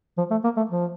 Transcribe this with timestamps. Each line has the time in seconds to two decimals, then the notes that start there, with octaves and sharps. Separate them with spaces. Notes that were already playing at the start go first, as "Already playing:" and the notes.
0.18 F3
0.31 A3
0.44 A#3
0.57 A3
0.70 F3